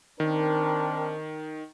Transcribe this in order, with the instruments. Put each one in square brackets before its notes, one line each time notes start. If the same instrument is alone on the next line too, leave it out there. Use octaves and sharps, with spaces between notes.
[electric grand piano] D#3 [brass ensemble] C4 D4 A#4